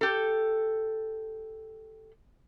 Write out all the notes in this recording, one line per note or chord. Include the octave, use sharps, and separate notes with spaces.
G4 A4